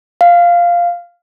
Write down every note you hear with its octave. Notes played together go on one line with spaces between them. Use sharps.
F5